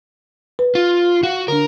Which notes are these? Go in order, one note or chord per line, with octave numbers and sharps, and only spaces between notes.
B4
F4
F#4 F5
D3 D4 A#4